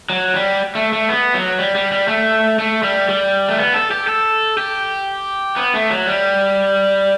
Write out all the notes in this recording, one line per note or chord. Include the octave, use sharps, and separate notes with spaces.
F#3
G3
A3
A3
B3
F#3
G3
G3
G3
A3
A3
G3
G3
A3
B3
A4
G4
A4
G4
B3
A3
F#3
G3